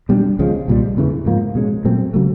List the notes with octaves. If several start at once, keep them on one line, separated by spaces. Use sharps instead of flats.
B2 G3 B3 D4
C#2 C#3 F3 G#3
C2 A#2 G3
E2 C#3 E3 A3
G#2 F3 A#3
B2 G#3 C#4
A#2 F#3 A3 C4
C#3 F#3 A3